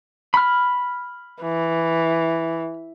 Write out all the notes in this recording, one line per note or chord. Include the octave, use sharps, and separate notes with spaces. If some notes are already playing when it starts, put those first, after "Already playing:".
B5 F6
E3